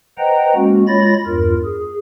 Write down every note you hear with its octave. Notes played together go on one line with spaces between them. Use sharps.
B4 C5 D#5 F#5 G5 A#5
G#3 A#3 C#4 F#4
G#3 F4 C#5 B5 A6 A#6
E2 G2 F4 A#4
G#4